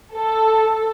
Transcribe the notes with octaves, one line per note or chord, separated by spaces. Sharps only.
A4